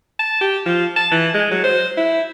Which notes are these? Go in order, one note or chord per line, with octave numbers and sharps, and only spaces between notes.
A5
G4
F3
A5
E3
G#3
F#3
C5
E4